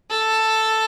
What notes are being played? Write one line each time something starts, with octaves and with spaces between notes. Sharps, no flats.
A4